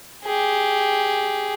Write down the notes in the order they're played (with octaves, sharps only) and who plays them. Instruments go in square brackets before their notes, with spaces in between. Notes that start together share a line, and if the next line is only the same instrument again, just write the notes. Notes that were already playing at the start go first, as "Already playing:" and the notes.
[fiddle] G4 G#4